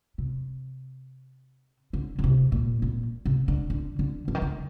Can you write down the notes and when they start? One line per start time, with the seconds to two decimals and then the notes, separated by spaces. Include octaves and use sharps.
0.18 C3
1.93 D3
2.19 D3
2.24 C3
2.52 A#2
2.82 A#2
3.25 C3
3.48 D3
3.70 D3
3.99 D3
4.28 D3
4.35 D#3
4.42 D3